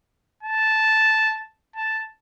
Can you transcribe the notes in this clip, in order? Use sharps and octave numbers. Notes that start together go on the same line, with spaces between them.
A5
A5